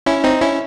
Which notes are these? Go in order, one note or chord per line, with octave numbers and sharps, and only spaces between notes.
C#4 E4
C4 D#4
C#4 E4